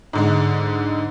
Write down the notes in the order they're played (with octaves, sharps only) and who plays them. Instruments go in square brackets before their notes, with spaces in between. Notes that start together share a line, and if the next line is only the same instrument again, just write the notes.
[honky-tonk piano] G#2 D3 G#3